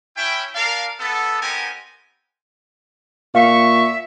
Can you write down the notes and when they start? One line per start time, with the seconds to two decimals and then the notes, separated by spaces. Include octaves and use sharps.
0.17 C#4 E4 G5
0.55 D4 A#4 D5 F5
1.00 B3 A4
1.41 B3 C4 D#4 G4 A#4 G#5
3.35 A#2 E5 F5 C#6